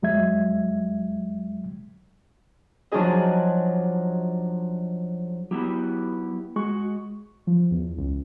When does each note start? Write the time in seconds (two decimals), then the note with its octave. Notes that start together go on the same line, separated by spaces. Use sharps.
0.02 F2 F#3 G#3 E5 G#6
2.92 F3 F#3 D4 D#4 G#4 D#5
5.51 F#3 B3 E4 G4
6.56 G#3 F#4 C#6
7.47 F3
7.71 E2
7.97 C#2